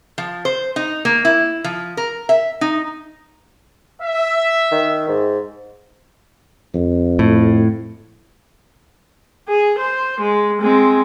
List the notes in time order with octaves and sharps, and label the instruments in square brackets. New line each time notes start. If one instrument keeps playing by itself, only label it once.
[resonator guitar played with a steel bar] F3
C5
D#4
A#3
E4
F3
A#4
E5
D#4
[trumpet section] E5
[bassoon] D#3
G#2
[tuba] F2
[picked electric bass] A2
[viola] G#4
C5
G#3
G#3 C4